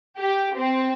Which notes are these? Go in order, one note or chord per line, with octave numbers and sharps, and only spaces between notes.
G4
C4